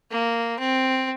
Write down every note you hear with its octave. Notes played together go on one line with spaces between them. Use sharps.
A#3
C4